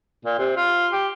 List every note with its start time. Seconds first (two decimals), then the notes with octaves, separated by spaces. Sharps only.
0.25 A#2
0.39 C3
0.57 F4
0.92 G4